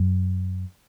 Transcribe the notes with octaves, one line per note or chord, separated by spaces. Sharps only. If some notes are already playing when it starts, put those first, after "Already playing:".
Already playing: F#2